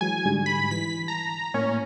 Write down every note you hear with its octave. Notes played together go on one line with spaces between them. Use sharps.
E3 F#3 G#3 G#5
G#2 D3 G3
B5
E3 B6
A5 A#5
A2 A#3 C#4